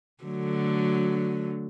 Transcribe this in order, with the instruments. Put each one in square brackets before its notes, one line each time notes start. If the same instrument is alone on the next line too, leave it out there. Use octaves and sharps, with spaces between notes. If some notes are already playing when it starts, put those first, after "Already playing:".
[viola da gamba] D3 F#3 A3